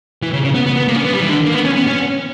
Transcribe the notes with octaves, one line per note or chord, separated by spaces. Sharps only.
E3
C#3
C#3
B3
B3
B3
A#3
C#4
B3
G3
E3
D3
A#3
B3
C#4
B3
C#4